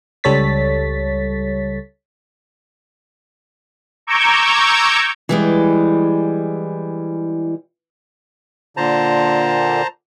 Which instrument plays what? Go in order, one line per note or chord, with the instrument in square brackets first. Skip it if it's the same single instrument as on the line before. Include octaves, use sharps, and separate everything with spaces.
[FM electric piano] C#2 G3 A4 C#5 A6 B6
[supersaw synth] A#5 C#6 D6 E6 G6 G#6
[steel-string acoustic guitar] E3 G3 G#3
[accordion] A#2 D3 [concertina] C5 A5 A#5